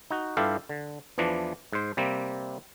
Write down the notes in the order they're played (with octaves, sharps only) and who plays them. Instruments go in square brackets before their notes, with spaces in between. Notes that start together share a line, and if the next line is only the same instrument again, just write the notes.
[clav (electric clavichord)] D#4 F#4
G2 E4 F4 G4 A4 F5
D3
E2 E3 F3 D4
G#2 C5
C3 G3 A#3 C4